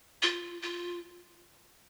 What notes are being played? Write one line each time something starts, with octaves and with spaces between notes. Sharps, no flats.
F4
F4